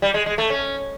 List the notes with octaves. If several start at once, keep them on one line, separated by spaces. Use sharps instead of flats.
G3
G#3
G#3
A3
C#4